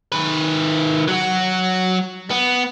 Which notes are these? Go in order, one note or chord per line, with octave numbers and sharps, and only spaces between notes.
D#3 B4
F#3 F#4
B3